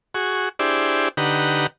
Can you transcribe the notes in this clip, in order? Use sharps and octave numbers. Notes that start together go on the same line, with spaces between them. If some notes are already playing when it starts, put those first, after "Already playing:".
F#4 G#4 C#6
D4 E4 G4 G#4 C5 D5
D3 D#4 G4 B4 F#5 A#5